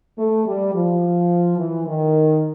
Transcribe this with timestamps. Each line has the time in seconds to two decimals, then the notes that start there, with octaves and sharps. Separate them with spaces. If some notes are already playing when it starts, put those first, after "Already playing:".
0.17 A3
0.45 G3
0.74 F3
1.58 E3
1.87 D#3